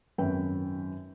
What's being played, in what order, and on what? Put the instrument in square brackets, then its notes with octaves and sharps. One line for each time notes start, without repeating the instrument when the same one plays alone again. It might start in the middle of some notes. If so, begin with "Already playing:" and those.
[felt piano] G#1 F#2 B4 G5